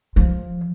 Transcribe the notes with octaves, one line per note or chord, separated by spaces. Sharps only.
F3